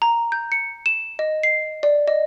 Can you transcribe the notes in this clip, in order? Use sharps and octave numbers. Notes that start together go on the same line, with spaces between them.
A#5
G6
C#7
E7
D#5
C7
D5
D#5